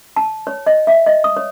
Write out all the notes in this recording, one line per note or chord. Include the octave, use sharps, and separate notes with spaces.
A5
C#5
D#5
E5
D#5
D#6
C#5